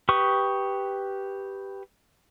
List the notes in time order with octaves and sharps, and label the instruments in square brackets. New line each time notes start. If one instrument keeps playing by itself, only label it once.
[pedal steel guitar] G4 B4 C#6 D#6